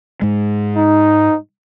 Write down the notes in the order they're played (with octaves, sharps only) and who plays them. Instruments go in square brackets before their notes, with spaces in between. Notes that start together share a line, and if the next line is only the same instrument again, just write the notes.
[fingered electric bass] G#2 G#3
[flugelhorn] D#4